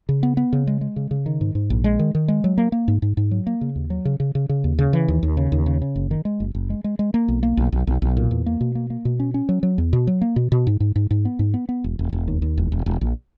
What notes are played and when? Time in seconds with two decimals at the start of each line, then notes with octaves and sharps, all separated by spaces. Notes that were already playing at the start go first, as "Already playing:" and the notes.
0.09 C#3
0.23 B3
0.37 B3
0.53 C#3
0.67 G#3
0.81 G#3
0.96 C#3
1.11 C#3
1.26 D#3
1.41 G#2
1.55 G#2
1.70 A#1
1.84 G#3
1.99 D#3
2.15 D#3
2.28 G#3
2.44 F#3
2.58 A#3
2.72 A#3
2.88 G#2
3.02 G#2
3.17 G#2
3.31 F#3
3.47 A#3
3.61 C#3
3.76 D#2
3.90 F#3
4.05 C#3
4.20 C#3
4.35 C#3
4.49 C#3
4.64 D#2
4.79 C#3
4.93 E3
5.08 D#2
5.23 D#2
5.37 C#3
5.52 D#2
5.66 C#3
5.82 C#3
5.96 F#1
6.11 D#3
6.25 G#3
6.40 F#1
6.55 F#1
6.70 G#3
6.84 G#3
6.99 G#3
7.14 A#3
7.28 B1
7.43 A#3
7.57 B1
7.72 B1
7.87 B1
8.02 B1
8.17 A#2
8.31 E2
8.46 A#3
8.61 B2
8.75 A#3
8.90 A#3
9.05 B2
9.20 C#4
9.34 C#4
9.49 F#3
9.63 F#3
9.78 E2
9.93 B2
10.07 F#3
10.22 A#3
10.36 B2
10.52 B2
10.67 G#2
10.80 G#2
10.96 G#2
11.11 G#2
11.25 B3
11.39 G#2
11.54 B3
11.69 B3
11.84 E1
11.99 E1
12.13 E1
12.28 D#2
12.42 D#2
12.58 E1
12.72 E1
12.86 E1
13.01 A#1